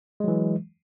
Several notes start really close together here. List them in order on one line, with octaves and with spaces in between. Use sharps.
G#3 F#3 E3